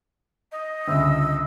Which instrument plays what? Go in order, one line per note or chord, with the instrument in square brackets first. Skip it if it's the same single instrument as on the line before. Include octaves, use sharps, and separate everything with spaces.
[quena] D#5
[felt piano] G1 C#2 [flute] E6